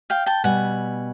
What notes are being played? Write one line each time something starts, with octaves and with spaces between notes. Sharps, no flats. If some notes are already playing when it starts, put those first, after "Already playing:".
F5 G5
G5 A5
B2 G3 B3 F#5 G#5